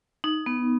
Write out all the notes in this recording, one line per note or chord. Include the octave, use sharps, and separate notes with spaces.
D#4
B3